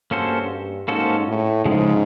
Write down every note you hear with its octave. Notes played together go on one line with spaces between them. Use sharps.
G2 A#3 C#4 F#4 A4 C5
G#2 A#3 C#4 F#4 A4 C5
A2
G#2 C#3 F3 G#3 C#4